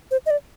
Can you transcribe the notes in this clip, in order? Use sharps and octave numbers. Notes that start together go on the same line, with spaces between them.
C5
D#5
D5